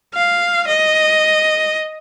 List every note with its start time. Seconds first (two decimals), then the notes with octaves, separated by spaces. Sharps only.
0.14 F5
0.67 D#5